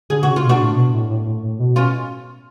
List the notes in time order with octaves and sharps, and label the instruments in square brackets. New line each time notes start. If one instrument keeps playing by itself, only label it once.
[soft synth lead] D3 [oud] G#4
[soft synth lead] C#3 [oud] F#4
[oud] F4
[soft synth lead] B2
[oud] D4 F#4
[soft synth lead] A2
B2
A2
A2
A2
A2
B2
[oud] C#4 F4